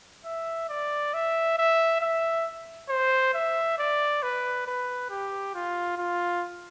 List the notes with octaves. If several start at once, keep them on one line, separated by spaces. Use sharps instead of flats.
E5
D5
E5
E5
E5
C5
E5
D5
B4
B4
G4
F4
F4